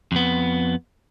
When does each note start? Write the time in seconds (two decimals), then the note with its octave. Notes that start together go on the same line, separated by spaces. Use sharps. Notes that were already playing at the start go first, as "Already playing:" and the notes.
0.12 F2 B3